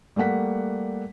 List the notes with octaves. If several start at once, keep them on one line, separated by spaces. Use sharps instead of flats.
G3 A3 A#3 F#5 B6